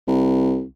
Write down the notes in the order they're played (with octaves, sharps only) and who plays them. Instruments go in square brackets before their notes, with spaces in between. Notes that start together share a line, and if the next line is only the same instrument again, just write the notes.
[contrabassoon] C2